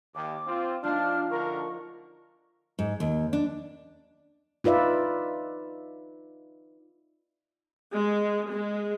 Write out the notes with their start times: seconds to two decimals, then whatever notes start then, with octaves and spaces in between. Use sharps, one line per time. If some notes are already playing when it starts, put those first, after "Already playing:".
0.15 D#2 D6
0.47 C4 F4
0.83 F3 D4 D#4 F6
1.31 D2 D3 A#4 C#6
2.79 G#2
3.00 D#2
3.33 D4
4.64 D#4 F4 B4 D5 E5
7.94 G#3
8.51 G#3